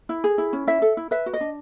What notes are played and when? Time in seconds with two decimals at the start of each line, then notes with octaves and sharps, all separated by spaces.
0.09 E4
0.24 G#4
0.38 E4
0.53 C#4
0.67 E4 E5
0.82 A4
0.97 E4
1.11 B4 E5
1.26 F#4
1.34 D#5
1.41 D4